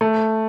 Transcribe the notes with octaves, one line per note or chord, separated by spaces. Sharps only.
A3